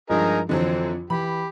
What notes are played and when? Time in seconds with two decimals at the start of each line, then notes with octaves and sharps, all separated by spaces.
0.10 G2 F3 G#3 D#4 G#4 A#4
0.49 F2 D3 E3 F#3 C4
1.10 E3 G4 B5